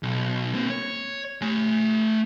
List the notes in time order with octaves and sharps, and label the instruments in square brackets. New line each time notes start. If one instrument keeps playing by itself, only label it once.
[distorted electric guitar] B1
A#3 C4
C#5
A3 G#5